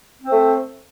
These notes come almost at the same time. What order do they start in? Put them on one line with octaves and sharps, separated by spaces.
C4 C5 A3